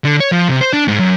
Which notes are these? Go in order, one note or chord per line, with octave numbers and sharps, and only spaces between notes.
D3
C#5
F3
C3
C5
D4
G#2
F#2